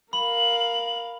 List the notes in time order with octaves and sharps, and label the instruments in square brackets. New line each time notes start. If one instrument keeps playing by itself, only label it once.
[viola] A#4 F5 [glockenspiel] B5 [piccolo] F#7